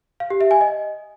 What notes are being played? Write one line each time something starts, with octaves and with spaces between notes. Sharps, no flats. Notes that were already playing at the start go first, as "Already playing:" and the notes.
F5
G4
E5
G#5
D#5